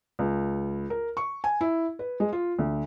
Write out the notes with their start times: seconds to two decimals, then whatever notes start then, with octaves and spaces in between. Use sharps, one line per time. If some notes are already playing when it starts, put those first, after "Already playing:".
0.19 C#2
0.90 A#4
1.17 C#6
1.44 G#5
1.61 E4
1.99 B4
2.20 G#3
2.32 F4
2.58 D2